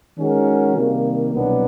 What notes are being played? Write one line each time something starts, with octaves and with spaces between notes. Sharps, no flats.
D#3 G#3 C#4 F#4 A#4
C3 D#3 G3 A#3
C2 B2 F#3 B3 D4